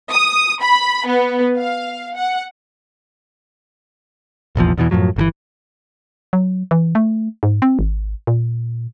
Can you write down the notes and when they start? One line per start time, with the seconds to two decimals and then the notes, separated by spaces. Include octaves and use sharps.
0.12 D#6
0.62 B5
1.07 B3
1.57 F5
2.15 F#5
4.56 F1 A#1 E2 F3
4.78 E2 B2 D#3 E3
4.91 F#2 A2 F3 F#3
5.16 G1 C3 E3
6.33 F#3
6.71 E3
6.95 A3
7.43 G#2
7.62 C4
7.79 G#1
8.27 A#2